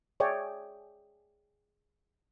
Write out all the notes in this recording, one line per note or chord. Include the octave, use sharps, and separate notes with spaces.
G#4 C#5 D5 E5 G5